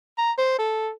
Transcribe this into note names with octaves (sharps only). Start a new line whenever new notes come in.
A#5
C5
A4